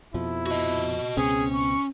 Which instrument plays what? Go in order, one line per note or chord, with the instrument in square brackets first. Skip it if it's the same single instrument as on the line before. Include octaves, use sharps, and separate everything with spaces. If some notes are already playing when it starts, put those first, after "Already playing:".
[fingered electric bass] F2 B2 F3 [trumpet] E4
[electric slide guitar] F#4 D#5
[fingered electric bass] C#2 B2 C4 [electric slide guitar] C#4 [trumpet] G#4
[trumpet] C#6